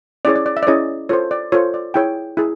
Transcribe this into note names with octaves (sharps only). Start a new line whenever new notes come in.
C#4 E4 G#4 C#5 D5
D5
D5
E5
D5
C#4 E4 G#4 C#5 D#5
F4 A4 C5 C#5
D5
F4 A4 C5 C#5
D5
E4 G#4 C#5 G5
E4 G#4